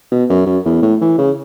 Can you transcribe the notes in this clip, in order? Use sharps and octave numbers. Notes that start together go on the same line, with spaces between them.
B2
F#2
F#2
E2
A2
E3
C#3